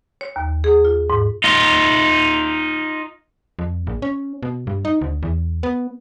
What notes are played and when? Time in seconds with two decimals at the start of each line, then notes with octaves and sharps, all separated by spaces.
0.21 C#5
0.36 D#2
0.64 G#4
0.85 F4
1.10 G#2
1.44 D#4 F4
3.59 F2
3.87 A#1
4.02 C#4
4.43 B2
4.67 G2
4.85 D#4
5.01 D2
5.23 E2
5.63 B3